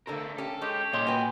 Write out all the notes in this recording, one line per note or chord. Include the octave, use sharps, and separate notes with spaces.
D3 A3 A4 A#4 C5
C#4 G4 A4
G#3 C#4 G4 C#5
A#2 A#3 C#5 D#5 C6
F#4 B4 G5 G#5